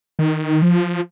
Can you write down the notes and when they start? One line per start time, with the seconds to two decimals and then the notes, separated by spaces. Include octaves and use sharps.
0.19 D#3
0.62 F3